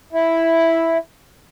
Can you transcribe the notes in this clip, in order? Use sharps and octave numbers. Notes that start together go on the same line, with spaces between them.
E4